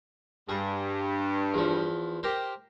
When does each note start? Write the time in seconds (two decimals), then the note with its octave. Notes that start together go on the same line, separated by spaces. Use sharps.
0.49 G2 G#4
1.54 E2 F3
2.23 G4 A#4 C5